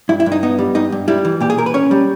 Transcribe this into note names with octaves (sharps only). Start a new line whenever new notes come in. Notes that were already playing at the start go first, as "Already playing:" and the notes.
G2 E4
E4
G2
D#4
B3 D#4
G3
G2 D#4
G2
G3 E4
E3
A#2 G4
G#4
A#2 A#4
B4
C#4 C#5
G3